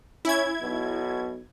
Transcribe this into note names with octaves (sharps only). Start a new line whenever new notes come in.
C#4 E4 G#6
B1 B2